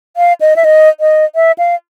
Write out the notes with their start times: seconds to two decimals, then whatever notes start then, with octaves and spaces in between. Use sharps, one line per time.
0.17 F5
0.41 D#5
0.56 E5
0.64 D#5
1.00 D#5
1.35 E5
1.58 F5